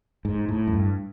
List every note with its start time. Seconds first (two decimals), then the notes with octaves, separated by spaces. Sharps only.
0.25 G#2
0.49 A2
0.67 F#2
0.74 G2